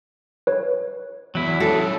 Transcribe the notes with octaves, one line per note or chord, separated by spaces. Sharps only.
B4 C#5
E2 F#3 E4
G3 C#4 A4